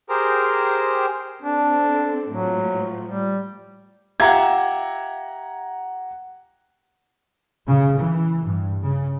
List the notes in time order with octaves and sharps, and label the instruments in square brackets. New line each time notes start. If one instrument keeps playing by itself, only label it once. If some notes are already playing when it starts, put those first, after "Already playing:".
[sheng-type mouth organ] G4 G#4 A#4 C5 G5 A#5
[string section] C4 A4 [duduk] D4
[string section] A2 F3 [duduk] F#3
[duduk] G3
[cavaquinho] F4 G4 E5 [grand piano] F#5 A#5 G#6
[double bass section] C#3
E3
G2
C#3